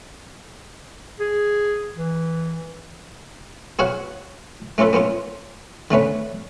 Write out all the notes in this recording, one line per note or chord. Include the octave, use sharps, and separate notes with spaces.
G#4
E3
B3 F#4 G#4 C#5 F5 F#5
A3 C#4 F4 A4 B4
A#3 B3 C#4 F4
D3 A3 C#4 B4